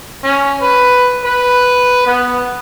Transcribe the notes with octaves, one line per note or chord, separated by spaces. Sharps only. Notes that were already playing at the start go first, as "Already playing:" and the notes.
C#4
B4
B4
B3